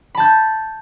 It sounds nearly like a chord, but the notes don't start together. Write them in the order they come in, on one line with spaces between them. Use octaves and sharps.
B5 A5 G6